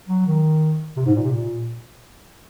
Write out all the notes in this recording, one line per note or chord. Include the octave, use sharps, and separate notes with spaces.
F#3
D#3
C3
G#2
A#2
C3
A#2